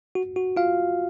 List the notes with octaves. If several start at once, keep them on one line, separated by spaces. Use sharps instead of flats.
F#4
F#4
F4 F5